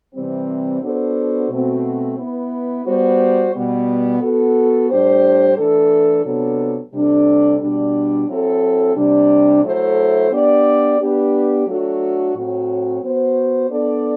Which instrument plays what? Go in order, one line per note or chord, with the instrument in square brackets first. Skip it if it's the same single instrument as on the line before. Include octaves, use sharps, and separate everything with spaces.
[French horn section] C3 E3 G3 C4
B3 D4 F#4 A4 C5
B2 A3 C4 F#4
B3 E4 B4
G3 B3 F#4 C5
B2 G3 B3
B3 F#4 A4
A2 G3 D4 G4 C5
E3 A3 D4 A4
C3 F#3 B3 D4 A4
C3 G3 D4 A4
B2 G3 D4
F#3 C4 E4 A4
C3 G3 D4
F#3 A3 E4 A4 C5
B3 D4 G4 D5
B3 D4 G4 B4
F#3 A3 D4 F#4 A4
A2 F#3 C4 F#4
B3 F#4 C5
B3 D4 A4 D5